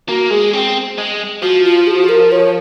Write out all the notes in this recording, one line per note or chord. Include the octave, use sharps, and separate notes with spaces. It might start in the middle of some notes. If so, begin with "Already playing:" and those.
A#3 F#4
G#3 G#4
C4
G#3
F3 F#4
F4
G#4
F#4
A#4
C#5